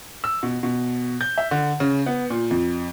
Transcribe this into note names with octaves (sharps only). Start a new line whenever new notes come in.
E6
B2
B2
G6
E5
D3
C#3
B3
A#2
F2